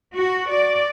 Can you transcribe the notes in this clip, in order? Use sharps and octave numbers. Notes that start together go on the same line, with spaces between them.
F#4
D5